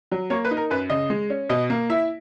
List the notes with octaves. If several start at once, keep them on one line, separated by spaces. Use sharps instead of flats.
F#3
A#3 C#5
B4
D#4
A#4
F#2 B4
C#3 D#5
G#3
C#4
B2 D#5
A#3
E4 E5